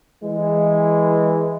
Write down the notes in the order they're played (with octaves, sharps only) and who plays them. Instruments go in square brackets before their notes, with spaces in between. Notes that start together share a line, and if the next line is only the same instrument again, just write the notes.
[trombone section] E3 G#3